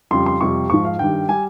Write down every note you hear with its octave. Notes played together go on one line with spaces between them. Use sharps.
F2 C#3 G3 C6
C6
F2 C3 G3 C#6
G#2 F3 C#6
F5
G2 D#3 G3 G5
G3 G#5